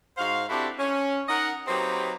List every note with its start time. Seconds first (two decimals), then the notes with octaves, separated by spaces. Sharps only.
0.18 G#2 F#4 C5 F5
0.50 C4 D4 E4 F#4 G4 A4
0.79 C#4
1.29 D#4 A#4 D#5 F#5
1.67 F#3 A#3 C4 D#4 G4 B4